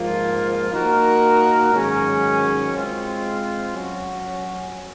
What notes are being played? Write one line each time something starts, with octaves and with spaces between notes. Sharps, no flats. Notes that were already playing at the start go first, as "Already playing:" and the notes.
Already playing: G#2 F3 A#3 F4
A#3 D#4 F#4 A#4
G#2 D#3 F#3 C#4 G#4
G#3 C4 F4
F#3 C#4 F#4